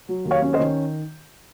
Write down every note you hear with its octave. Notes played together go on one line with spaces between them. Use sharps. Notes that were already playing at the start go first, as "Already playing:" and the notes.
F#3
D#2
C#5 F5
C#4
C5 D#5
D#3